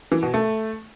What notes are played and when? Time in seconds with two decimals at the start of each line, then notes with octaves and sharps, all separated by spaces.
0.12 E3
0.23 B2
0.34 A3